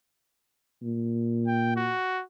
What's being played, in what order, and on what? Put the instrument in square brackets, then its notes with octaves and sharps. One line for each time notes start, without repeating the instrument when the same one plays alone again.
[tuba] A#2
[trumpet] G5
F#4